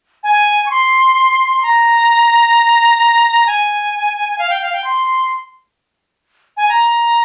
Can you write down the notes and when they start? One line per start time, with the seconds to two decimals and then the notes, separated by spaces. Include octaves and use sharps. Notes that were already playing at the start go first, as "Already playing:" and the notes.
0.23 G#5
0.66 C#6
0.71 C6
1.63 A#5
3.47 G#5
4.39 F5
4.50 G5
4.62 F5
4.73 G5
4.84 C6
6.57 G#5
6.69 A#5